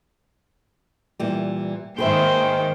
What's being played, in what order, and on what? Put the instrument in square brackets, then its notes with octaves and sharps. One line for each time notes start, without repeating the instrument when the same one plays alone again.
[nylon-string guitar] A#2 E3 G3
[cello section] G#2 D#3 A#3 [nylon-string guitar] G#4 B4 E5 [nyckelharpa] C5 G5